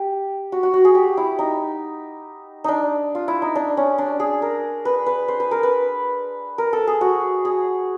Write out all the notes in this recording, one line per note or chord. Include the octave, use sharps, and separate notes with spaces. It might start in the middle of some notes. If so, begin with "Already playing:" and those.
Already playing: G4
F#4
F#4
F#4
G#4
G4
E4
D#4
D4 D#4
F4
E4
D#4
D4
C#4
D4
G#4
A#4
B4
B4
C5
B4
A#4
B4
A#4
A4
G#4
F#4
G#4